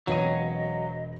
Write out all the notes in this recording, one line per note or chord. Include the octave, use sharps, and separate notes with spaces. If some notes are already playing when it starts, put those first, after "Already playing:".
E1 F#3 C4 B4 C#5 D#5 F5 D#7